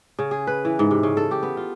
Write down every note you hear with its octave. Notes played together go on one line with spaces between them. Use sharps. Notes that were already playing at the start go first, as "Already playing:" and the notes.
C#3
G#4
B4
E3
G#2
C3
C#3
A4
G4
B3
F4